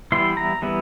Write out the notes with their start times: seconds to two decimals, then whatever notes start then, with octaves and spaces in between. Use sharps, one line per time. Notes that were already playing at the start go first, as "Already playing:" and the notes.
0.12 E3 G3 B3 E4 C6
0.37 A#5
0.62 E3 G3 B3 E4